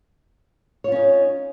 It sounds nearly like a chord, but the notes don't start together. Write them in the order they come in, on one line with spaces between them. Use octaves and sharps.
C#5 F4 C#4 D#4